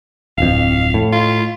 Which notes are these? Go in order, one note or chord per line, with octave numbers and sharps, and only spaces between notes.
D1 F2 F5
A2
F4